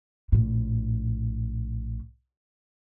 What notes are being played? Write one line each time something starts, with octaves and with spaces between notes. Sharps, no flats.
A#1 A2